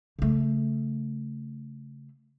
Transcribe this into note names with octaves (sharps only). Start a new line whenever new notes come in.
C#3 A3